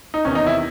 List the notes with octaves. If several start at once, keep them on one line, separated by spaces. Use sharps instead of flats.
D#4
E2 C3 D#3 C#4
D#4
E4